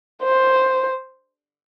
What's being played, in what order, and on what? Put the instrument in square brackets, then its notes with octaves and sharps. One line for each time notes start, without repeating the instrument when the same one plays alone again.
[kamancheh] C5